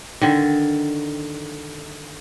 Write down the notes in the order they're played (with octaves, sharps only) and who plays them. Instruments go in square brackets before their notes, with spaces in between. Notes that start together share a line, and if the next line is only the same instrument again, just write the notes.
[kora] D3 D#3